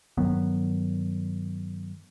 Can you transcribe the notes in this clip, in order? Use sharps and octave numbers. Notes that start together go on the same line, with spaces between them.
G2 D#3 F#3 B3